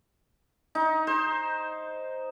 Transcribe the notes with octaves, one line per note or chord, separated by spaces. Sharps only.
D#4
C5